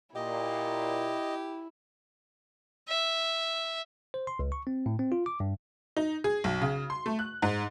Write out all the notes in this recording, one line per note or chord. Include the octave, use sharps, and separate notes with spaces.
A#2 E4 G4 D#5
E5
C5
C6
C#2
C#6
C4
A2
C4
F4
D6
G2
D#4
G#4
B1
C#3
C6
A3
F#6
G#2